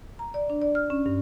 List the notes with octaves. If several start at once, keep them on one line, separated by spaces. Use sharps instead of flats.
A#5
D5
D4
D5
F6
C#4
G2